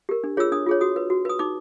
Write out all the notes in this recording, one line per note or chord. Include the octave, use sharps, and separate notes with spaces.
G4 A#4
D4
F4 G#4 C#5 E6
D4 D#6
F4 G#4 C#5
F#4 D#6
B4
F#4
B4 D#6
D#4 D6